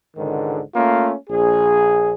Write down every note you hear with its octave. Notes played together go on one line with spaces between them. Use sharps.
C#2 G#2 D3 D#3
A3 A#3 C#4 F4
A#1 G#4